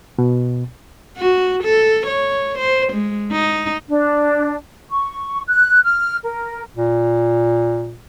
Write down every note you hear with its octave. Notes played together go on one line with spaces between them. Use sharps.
B2
F#4
A4
C#5
C5
G#3
D#4
D4
C#6
F#6
F6
A#4
A#2